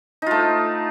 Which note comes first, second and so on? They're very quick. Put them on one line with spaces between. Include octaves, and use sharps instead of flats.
D#4 F4 A3